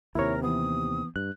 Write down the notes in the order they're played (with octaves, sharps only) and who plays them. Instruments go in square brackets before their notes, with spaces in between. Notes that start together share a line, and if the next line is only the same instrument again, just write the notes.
[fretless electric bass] D#2 C3 [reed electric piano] E4 C#5 [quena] A#4
[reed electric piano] E3 B3 [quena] D#6
[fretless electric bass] G2 [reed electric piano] F#6